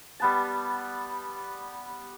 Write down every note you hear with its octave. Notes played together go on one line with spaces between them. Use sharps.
G3 B3 A5